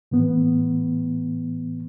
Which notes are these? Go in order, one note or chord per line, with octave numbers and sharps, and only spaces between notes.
A2 E3 B3